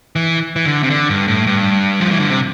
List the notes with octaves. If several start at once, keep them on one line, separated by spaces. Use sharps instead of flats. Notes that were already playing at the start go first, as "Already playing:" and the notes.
E3
E3
D3
C3
D3
G2
A2
G2
F3
E3
D3
C3